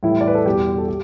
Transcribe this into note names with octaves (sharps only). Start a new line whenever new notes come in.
A2 E3 G3 E4
D5
B4
A4
E2 B2 G3 G4
A4
G4